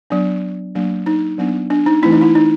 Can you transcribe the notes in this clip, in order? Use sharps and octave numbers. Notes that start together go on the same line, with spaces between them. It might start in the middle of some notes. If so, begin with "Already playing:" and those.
F#3 B3 D4
F#3 A#3 D4
D#4
F#3 B3 D4
D4
D#4
E3 A3 C4 E4
D#4
E4
D#4